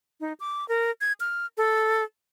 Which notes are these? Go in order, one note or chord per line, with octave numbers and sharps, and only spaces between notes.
D#4
D6
A#4
G#6
F6
A4